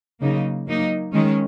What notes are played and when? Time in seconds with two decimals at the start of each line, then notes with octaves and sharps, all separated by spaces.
0.21 C#3 F#3 A#3 D#4
0.67 F#3 A#3 D#4
1.12 D#3 G#3 C#4